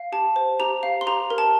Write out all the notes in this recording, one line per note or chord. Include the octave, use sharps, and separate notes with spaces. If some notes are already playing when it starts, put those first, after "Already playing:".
Already playing: F5
G4 A5
C5
G4 A#5
F5
C6
G4 A#5
A#4
A5